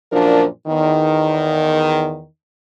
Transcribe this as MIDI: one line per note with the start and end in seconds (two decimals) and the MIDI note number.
0.12 0.46 42
0.12 0.46 46
0.12 0.46 53
0.12 0.46 62
0.12 0.46 70
0.67 2.26 40
0.67 2.26 51